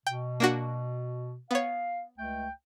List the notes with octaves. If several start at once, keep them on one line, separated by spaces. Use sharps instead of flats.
B2 G5
A#3 D4 F#4
B3 C#5 F5
C#2 A3 G5